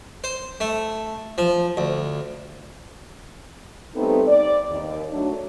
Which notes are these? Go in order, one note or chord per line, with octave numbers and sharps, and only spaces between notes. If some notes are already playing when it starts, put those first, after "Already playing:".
C5
A3
F3
D2
G3 A3 B3 C4 D#4 A4
D5
D#2
F#3 A3 D4